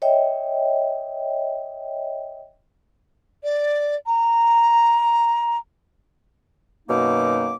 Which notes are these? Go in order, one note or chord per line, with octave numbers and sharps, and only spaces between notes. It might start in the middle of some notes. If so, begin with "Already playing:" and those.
C#5 D#5 E5 G5
D5
A#5
F#2 B2 A#3 D#4 D6